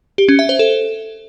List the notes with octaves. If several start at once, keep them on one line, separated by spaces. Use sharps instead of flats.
G4
C#4
E5
C5
A4